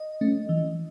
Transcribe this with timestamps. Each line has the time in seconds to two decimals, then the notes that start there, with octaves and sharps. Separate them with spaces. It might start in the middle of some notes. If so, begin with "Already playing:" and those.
Already playing: D#5
0.21 A3 C#4
0.49 E3